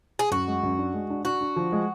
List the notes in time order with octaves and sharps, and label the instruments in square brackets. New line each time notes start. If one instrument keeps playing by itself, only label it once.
[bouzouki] G#4
[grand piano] F#2 [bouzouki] F#4
[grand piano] G#3
F#2
D4
G#3
D4
[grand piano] D4 [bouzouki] F#4
[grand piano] D4
F3
G#3